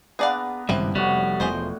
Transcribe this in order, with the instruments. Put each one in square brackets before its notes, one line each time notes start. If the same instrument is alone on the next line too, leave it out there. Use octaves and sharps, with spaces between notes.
[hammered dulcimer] B3 D4 A#5 [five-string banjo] G#4 D5 F5
[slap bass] G#1 C#3 E3 [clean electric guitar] G2 [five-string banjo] C4 E4
[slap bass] F1 [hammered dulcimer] A2 F#4 [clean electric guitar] G3
[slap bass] E1 F3 [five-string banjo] G#4 C5 D#5